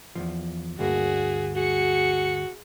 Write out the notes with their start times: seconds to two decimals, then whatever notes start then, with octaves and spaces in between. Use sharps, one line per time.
0.15 E2 G#2 F3
0.79 D2 G2 A#3 F#4 G#4
1.56 F#4 G#4 C#7